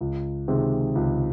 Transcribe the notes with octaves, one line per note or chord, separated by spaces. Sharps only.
C#2
C3 D#3 G#3
C#2